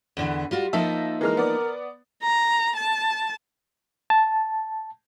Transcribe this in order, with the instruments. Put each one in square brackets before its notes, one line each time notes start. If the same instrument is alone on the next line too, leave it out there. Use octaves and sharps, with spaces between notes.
[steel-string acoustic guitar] E2 D3 E3
G3 F4 F#4
[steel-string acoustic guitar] F3 A#3 D#4 [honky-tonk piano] E5 A5
[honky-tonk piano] E3 G#3 F6 [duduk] A#4
[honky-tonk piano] B3 D5
[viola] A#5
A5
[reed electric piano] A5